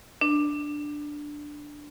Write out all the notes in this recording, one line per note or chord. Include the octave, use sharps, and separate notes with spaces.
D4